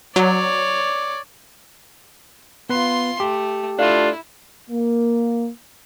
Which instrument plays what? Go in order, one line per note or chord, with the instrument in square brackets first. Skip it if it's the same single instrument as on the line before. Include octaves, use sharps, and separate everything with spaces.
[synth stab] F#3 [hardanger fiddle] C#5 D5
[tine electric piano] B3 B4 [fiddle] F4 C6
[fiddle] A3 [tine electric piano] G4
[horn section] A3 D4 F4 [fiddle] E4
[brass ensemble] A#3